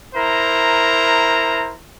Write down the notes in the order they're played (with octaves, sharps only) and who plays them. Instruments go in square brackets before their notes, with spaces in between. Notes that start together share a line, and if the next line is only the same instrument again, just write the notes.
[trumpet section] E4 A#4 C5 A#5